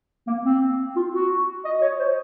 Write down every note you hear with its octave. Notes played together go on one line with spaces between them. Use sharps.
A#3
C4
F4
F#4
D#5
C#5
C5